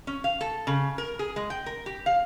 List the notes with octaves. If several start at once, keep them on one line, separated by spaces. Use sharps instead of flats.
C#4
F5
A4
C#3
A#4
G#4
G#3
G5
A#4
G4
F5